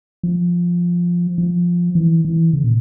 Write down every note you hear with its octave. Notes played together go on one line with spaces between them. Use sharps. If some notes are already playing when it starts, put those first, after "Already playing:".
F3
F3
E3
E3
C#3
A#2